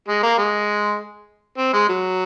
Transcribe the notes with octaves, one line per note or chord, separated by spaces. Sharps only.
G#3
A#3
G#3
C4
G#3
F#3